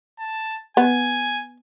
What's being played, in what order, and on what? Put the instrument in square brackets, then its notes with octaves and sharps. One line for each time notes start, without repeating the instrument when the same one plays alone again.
[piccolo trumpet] A5
[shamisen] B3 [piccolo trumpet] G#5